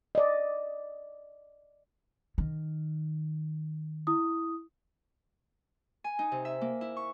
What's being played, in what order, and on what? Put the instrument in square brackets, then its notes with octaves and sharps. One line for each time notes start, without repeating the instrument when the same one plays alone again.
[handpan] D5 D#5
[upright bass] D#3
[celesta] E4 D#6
[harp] G#5
D#4
C3
E5
A#3
E4
C#6